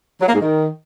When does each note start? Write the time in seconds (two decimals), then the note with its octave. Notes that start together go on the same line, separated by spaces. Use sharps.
0.21 F#3
0.27 A#3
0.34 G#2
0.41 D#3